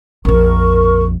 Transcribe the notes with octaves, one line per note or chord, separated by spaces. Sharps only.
A#1 F2 A#4 C#6